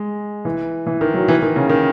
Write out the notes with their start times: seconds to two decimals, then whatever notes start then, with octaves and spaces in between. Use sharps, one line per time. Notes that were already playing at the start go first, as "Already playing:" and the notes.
Already playing: G#3
0.45 E3
0.87 E3
1.01 D#3
1.14 F#3
1.28 E3
1.42 D#3
1.56 C#3
1.69 D#3